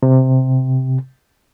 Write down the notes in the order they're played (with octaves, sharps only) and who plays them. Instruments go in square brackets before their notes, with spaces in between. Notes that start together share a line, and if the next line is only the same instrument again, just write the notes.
[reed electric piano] C3